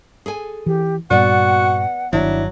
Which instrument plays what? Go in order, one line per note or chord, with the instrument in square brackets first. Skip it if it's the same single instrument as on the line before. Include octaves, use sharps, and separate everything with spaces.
[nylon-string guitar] G#4 A4 G#5
[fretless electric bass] E3 [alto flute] G4
[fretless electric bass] G2 A#2 G3 [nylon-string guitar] B3 D5 [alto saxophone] F#4 [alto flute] F#5
[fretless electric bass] G1 D#3 [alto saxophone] F#3 [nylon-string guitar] D4 E4